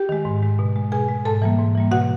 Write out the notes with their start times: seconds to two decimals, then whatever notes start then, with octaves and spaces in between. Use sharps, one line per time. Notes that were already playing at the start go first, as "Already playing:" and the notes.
Already playing: G4 G5
0.09 D#3 G#3
0.25 G#2
0.42 D#3 G#3
0.59 B2
0.76 G#3
0.92 B2 G#4 G#5
1.08 G#3
1.25 G#2 A4 A5
1.42 E3 G3 A#3
1.58 G#2
1.75 E3 G3 A#3
1.91 B2 F#4 F#5